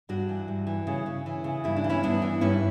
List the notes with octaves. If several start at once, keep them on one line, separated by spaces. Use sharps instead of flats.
G2 D4 F#4
E3
G2
E3
C#3
C#3
E3
C#3
G2 E4
D4
E3
C#4 E4
G2 B3 D4
E3
G2 C#4 E4